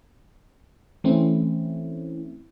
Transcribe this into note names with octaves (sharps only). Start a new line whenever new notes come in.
E3 A3 C4 C#4 E4